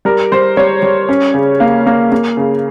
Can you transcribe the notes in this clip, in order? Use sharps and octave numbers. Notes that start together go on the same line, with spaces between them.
G3 A#4
G3 C5
G3 C#5
G3
C#4
C#3
A#3 F5
A#3
A#3
C#3